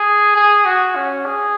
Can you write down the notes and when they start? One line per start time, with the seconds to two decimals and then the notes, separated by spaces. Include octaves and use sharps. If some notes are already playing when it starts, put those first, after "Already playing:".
Already playing: G#4
0.36 G#4
0.65 F#4
0.96 C#4
1.26 G#4